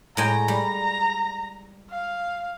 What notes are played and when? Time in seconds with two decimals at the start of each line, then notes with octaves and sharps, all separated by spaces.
0.17 A2 G#3 G5 A#5
0.48 G3
1.90 F5